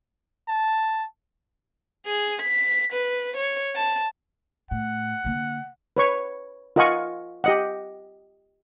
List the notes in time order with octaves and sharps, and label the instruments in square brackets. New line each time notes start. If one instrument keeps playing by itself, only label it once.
[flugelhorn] A5
[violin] G#4
B6
B4
C#5
A5
[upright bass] A2 [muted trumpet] F#5
[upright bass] D3 A#3
[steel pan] B4 C#5 C#6
F4 A#4 D#5 F#5 G#5 C#6
G4 D#5 F#5